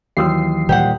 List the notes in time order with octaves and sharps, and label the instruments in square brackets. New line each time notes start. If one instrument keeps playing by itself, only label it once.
[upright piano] D#2 D#6 E6 [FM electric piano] E3 F#3 C7
[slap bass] A#2 G3 [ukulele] G4 C5 F#5